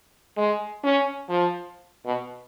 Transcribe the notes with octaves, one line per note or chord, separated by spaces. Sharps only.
G#3
C#4
F3
B2